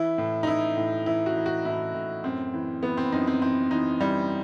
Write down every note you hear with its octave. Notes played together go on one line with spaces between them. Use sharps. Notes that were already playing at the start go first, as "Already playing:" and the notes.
Already playing: E3 E4
A2
D#4
E3 E4
A2
E3 E4
F#4
E3
F#4
A2 E4
A2
F#2 C4
E3
E3 B3
C4
F#2 D#4
C4
E3 C4
E3 D#4
E3 G3